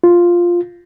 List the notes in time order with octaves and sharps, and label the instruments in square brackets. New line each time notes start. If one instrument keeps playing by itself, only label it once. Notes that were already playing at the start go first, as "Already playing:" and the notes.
[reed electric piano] F4